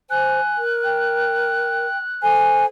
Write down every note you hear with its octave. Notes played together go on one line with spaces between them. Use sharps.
C5 G#5 F#6
A#4
G5
A4 C5 G#5